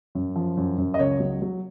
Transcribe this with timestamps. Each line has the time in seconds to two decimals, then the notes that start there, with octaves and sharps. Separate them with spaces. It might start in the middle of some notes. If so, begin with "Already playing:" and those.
0.15 F#2
0.36 F3
0.57 F#2
0.78 F#2
0.94 D#5
0.99 C#2 C#5
1.20 F#3
1.42 F#3